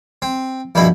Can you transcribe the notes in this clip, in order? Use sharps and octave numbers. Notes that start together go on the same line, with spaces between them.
C4
A#1 G2 B2 E4 B5